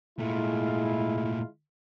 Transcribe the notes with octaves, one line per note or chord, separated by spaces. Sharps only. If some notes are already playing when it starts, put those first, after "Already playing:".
A#2 G#3 A3 E4 F4